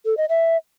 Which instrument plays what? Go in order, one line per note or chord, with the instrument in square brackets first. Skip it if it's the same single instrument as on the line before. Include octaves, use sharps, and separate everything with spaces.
[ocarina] A4
D#5
E5